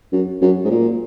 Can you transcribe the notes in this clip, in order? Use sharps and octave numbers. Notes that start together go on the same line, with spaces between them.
F#2
F#2
G#2
A#2